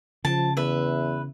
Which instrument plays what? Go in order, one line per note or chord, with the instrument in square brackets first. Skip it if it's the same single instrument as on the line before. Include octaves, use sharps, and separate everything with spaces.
[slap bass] C#3 [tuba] F3 [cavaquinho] A5
[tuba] E2 [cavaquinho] B4 E5